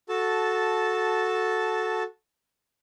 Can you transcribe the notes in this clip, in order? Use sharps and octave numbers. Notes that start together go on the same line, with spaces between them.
F#4 A4 A5